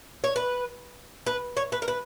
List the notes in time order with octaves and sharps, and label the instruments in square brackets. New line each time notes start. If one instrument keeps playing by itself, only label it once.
[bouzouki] C#5
B4
B4
C#5
B4
A#4
B4